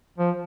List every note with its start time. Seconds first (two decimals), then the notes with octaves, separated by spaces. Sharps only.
0.18 F3